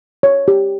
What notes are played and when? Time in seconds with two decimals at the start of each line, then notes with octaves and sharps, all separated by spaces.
0.23 C#5
0.48 G4